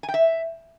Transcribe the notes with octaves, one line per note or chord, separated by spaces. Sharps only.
G#5
G5
E5